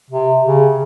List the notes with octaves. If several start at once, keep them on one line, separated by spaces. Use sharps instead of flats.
C3
C#3